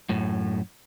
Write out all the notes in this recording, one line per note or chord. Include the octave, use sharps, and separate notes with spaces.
F#2 A2